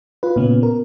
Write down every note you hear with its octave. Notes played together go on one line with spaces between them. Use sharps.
F4 B4
A#2 C#3 B3 C#4
A#4